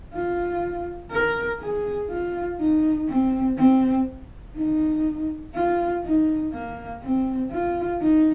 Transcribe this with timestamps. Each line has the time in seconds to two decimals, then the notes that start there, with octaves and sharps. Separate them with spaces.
0.13 F4
1.11 A#4
1.60 G#4
2.09 F4
2.59 D#4
3.08 C4
3.57 C4
4.56 D#4
5.54 F4
6.04 D#4
6.52 A#3
7.02 C4
7.50 F4
8.00 D#4